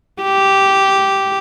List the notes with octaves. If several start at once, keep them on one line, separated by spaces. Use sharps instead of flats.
G4